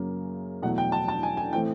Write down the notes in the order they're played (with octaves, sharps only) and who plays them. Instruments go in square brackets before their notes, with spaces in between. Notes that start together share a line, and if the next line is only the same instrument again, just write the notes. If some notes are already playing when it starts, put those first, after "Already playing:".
Already playing: [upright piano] F#2 C#3 F#3 A#3
E2 B2 F#3 A3 F#5
G5
A5
A5
G#5
G#5
A2 E3 A3 C4 G5